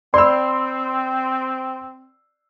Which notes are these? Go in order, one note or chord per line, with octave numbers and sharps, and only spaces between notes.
C4 D5 B5 C6 E6